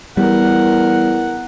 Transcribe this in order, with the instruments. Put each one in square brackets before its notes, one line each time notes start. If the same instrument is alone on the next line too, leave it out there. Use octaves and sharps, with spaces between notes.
[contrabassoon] E2 [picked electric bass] G3 [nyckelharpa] A#4 F#5